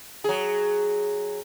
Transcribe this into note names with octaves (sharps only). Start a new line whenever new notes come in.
F#3 G#4